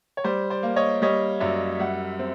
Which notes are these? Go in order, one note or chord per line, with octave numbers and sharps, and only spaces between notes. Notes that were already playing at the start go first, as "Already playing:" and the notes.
C#5
G3 C5 D5
C5 D5
A#3
C#5 D#5
G3 C#5 D#5
F#2 D5 E5
G3 E5 F#5
C4